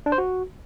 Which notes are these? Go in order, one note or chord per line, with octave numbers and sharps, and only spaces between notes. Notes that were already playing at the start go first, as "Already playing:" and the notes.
D4
C5
F#4